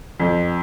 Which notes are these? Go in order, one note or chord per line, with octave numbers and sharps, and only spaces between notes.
F2